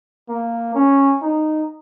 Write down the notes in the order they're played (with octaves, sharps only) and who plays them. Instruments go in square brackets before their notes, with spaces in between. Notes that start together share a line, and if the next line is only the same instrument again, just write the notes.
[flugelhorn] A#3
C#4
D#4